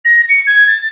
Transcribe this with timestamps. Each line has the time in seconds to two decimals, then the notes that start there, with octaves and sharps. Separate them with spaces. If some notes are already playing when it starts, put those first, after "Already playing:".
0.05 A#6
0.29 C#7
0.47 G#6
0.67 A6